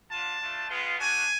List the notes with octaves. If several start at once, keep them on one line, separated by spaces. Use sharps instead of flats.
B3 D4 F4 A5
A3 D4 F4
G#3 B3 F4
A3 D4 F#4 G#5